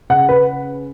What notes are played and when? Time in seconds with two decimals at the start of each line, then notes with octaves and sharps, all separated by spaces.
0.10 C#3 F#5
0.29 B4